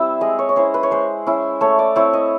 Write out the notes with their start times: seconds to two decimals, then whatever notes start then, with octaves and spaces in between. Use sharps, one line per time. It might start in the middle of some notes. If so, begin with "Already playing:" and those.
Already playing: G3 C4 E4 E5
0.21 G#3 D#5
0.39 C#5
0.49 C#5
0.56 C#4 E4 C5
0.74 B4
0.83 C#5
0.91 G#3 C5
1.27 C#4 E4
1.61 A3 C#5
1.79 D5
1.96 C4 E4 C#5
2.13 D#5